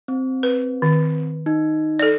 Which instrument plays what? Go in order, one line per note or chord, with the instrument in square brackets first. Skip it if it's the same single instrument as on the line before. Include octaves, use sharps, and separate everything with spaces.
[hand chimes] C4
[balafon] B4
D#3
[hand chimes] D#4
[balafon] A4 D5